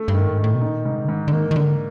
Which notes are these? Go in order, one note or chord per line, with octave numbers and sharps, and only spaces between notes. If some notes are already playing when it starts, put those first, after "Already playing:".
Already playing: A3
G2
D#3
G#2
D#3
A2
B2
A#2 D#4
G#2 C3
D3
G#2 D#3
D3
D#3 A#3
D#3
D3 A#3